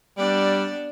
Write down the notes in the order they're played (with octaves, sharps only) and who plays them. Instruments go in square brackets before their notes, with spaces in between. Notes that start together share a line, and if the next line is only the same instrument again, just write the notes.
[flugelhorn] G3 [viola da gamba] B3 D4 D5